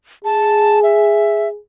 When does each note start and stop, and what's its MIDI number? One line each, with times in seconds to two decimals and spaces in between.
0.25 1.58 68
0.25 0.80 81
0.83 1.48 76